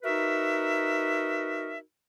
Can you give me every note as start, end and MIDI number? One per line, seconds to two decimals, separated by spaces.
0.03 1.78 63
0.03 1.78 66
0.03 1.78 70
0.03 1.78 71
0.03 1.78 76